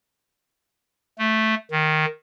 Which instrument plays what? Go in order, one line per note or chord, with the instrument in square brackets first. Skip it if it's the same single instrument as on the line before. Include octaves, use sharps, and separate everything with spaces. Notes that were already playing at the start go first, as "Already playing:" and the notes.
[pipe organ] A3
D#3